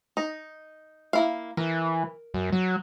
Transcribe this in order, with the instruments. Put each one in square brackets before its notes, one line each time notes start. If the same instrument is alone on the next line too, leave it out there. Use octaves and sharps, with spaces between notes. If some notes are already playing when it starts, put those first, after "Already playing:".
[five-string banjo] D#4
A#3 E4 F5
[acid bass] E3 [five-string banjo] A#4
[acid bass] F#2
F#3